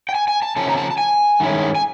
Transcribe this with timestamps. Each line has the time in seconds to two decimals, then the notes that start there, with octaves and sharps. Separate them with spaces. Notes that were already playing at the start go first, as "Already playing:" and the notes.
0.09 G5
0.15 G#5
0.28 G#5
0.42 A5
0.56 C#3 F3 A#3 C#4 A5
0.69 A#5
0.77 A5
0.91 A5
0.98 G#5
1.40 G2 D#3 G#3 C#4 E4
1.75 G#5